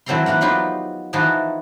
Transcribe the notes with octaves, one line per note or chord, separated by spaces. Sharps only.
E3 F#3 C4 A4 A#5 C6
E3 A#3 A#4 F#5
F3 F#3 B3 D#4 F4 G4
E3 F3 D#4 F#4 G#4 A5